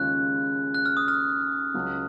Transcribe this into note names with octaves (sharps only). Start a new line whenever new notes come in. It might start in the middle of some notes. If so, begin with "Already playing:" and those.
Already playing: D#2 C#3 G#3 C#4 F4 F#6
F#6
F6
D#6
F6
C#2 C#3 F#3 C#4